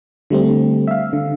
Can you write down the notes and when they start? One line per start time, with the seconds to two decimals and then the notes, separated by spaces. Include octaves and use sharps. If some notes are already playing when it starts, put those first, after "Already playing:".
0.30 D3 G3 A3 C4
0.87 E5 F5
1.13 D3